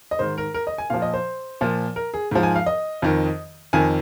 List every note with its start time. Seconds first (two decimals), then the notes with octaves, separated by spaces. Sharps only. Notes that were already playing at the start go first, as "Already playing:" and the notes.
0.11 D#5
0.19 G#2 D#3 C5
0.38 A#4
0.54 A#4
0.67 D#5
0.78 G#5
0.90 A#2 F3 F5
1.02 D#5
1.13 C5
1.61 A#2 F3
1.96 A#4
2.14 G#4
2.31 G#2 F3
2.43 G#5
2.56 F5
2.66 D#5
3.02 F2 D#3
3.73 F2 D#3 G#5